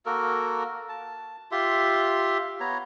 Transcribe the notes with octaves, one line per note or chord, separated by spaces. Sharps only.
A#3 F#4 A4 A#4
A5
F4 G4 E5 C6
B3 C#5 A#5